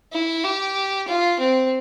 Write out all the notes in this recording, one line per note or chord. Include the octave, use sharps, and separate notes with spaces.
E4
G4
F4
C4